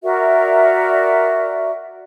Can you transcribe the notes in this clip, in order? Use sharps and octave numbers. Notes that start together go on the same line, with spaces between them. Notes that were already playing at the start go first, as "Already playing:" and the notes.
F#4 A#4 D5 E5